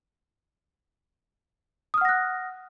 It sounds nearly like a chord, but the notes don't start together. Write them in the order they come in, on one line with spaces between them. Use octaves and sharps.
D#6 F6 F#5 A#6 F#6